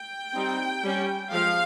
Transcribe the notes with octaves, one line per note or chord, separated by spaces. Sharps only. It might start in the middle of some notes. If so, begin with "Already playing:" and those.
Already playing: G5
G3 C4 D#4
G3 C#4
F3 G#3 F5